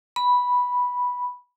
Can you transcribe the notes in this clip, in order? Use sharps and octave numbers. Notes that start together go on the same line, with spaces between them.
B5